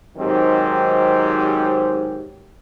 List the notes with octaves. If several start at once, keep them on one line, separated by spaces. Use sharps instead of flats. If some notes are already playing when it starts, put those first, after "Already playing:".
G#2 D#3 F#3 C4 G4